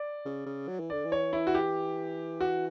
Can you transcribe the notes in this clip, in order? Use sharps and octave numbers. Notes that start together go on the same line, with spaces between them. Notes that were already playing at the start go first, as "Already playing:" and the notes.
Already playing: D5
C#3
C#3
F#3
E3
D3 D5
E3
C#5
E4
F#4
G4
F#4